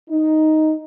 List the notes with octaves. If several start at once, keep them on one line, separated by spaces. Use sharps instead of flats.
D#4